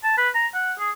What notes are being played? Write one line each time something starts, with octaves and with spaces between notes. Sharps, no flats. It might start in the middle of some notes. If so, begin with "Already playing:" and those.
A5
B4
A#5
F#5
G#4